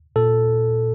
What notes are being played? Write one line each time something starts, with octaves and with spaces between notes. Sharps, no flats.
A#2 A4